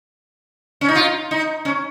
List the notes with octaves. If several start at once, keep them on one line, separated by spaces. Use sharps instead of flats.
C#4
D#4
F4
D#4
C#4